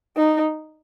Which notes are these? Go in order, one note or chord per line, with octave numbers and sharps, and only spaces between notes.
D#4